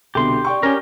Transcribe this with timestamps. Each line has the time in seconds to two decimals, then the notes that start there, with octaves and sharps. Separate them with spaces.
0.15 C2 B2 D3 G4 C6
0.45 D5 G5 C#6
0.63 C#4 G4 A#4